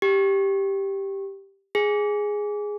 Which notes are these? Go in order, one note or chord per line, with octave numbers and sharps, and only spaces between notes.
G4
G#4